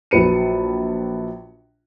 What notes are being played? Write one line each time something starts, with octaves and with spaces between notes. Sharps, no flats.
A#1 F#3 B4 C#7 D#7